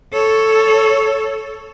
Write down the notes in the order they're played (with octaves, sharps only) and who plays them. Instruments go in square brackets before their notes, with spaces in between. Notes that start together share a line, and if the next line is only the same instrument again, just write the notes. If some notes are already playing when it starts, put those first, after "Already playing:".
[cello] A4 C#5